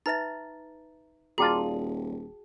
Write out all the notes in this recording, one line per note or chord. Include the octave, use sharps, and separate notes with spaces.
D#4 B4 E5 A#5 A6
D#1 F4 F#4 G#4 D5 G5 A5 A#5